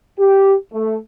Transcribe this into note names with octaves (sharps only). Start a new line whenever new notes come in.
G4
A3